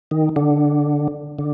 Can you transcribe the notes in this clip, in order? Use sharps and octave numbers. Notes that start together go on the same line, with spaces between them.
D#3
D3
D3